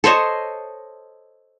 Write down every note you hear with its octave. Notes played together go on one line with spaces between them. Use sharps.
A4 C5 C#5 D#5